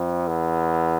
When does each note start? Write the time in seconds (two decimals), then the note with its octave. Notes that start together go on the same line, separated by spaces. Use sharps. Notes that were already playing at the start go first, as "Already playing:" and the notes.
Already playing: F2
0.28 E2